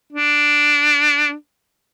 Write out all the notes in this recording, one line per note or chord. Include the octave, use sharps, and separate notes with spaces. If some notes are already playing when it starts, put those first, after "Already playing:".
D4